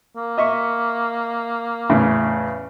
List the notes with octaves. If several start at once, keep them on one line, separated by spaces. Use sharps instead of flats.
A#3
D#5 E5 C#6
E2 A2 C#3